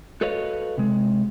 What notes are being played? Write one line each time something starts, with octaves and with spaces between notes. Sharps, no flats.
F#4 A4 B4 C#5 D#5 F5
C3 G#3